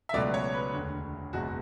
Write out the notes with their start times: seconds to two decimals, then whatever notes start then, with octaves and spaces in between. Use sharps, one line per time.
0.09 E5
0.13 C#2 B2 F#3 A3 D5
0.34 C#5
0.54 B4
0.73 E1 D2 D3
1.33 F#1 E2 B2 G#3 F#4